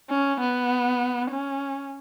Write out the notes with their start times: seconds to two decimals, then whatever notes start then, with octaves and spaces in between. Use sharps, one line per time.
0.10 C#4
0.41 B3
1.31 C#4